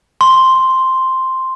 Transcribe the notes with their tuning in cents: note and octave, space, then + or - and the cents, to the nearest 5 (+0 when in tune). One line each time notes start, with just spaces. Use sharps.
C6 +0